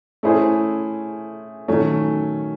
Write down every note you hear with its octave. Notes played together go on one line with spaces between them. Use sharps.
A3 C#4 E4 G#4 C5
D#3 F#3 A3 C#4